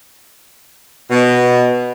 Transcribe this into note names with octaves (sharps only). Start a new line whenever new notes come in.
B2